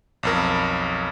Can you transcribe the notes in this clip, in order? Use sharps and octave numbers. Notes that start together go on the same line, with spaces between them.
B1 F2 A#4